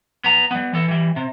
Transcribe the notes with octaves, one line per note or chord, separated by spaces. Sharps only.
B3 A#5
G3 B3
E3 A4
E3 G3
C3